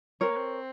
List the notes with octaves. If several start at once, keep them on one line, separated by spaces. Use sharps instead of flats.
C4 A#4 C#5
A#3
C4